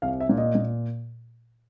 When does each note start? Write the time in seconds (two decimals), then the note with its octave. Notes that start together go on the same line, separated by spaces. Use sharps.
0.02 C2 F5
0.20 E5
0.29 A#2
0.38 D#5
0.55 A#2